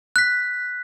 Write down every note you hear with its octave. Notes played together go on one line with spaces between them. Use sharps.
F#6 B6